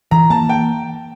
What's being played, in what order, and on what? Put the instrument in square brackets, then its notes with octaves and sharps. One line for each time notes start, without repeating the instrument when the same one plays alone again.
[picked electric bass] E3 [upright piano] A#5
[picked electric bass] A#3 [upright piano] A5
[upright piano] G5